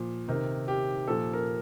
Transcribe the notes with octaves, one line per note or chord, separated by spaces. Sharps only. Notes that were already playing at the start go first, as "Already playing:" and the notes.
Already playing: A#2 F3
C3 D#3 A#4
G4
A#2 F3 A4
A#4